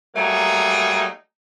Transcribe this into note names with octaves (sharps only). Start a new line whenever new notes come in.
F#3 G3 A3 A#3 D#4 G#4